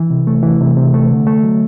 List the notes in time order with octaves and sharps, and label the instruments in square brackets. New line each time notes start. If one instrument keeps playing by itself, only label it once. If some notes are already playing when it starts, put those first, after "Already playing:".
Already playing: [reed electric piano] E3
C3
A3
E3
C3
C3
A3
D3
A3
F#3